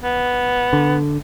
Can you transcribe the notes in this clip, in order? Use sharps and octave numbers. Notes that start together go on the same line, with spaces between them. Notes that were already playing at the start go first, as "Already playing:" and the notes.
B3
D3